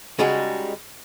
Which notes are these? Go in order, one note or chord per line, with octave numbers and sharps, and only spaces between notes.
C#3 G3 G#3 D#4 F#4 G#4